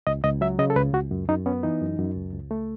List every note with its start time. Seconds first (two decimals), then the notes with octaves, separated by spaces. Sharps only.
0.07 C#2 D#5
0.24 C#2 D#5
0.41 F#3 E5
0.59 C#3 D#5
0.70 A4
0.76 C#2 B4
0.93 C#2 F#4
1.11 F#2
1.28 F#2 D#4
1.46 B3 C#4
1.63 E3 D#4
1.82 F#2
1.99 F#2
2.16 C#2
2.33 C#2
2.51 A3